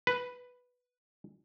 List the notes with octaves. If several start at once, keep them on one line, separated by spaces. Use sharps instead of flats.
B4